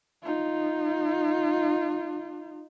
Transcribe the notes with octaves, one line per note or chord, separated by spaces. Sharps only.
D#4 F4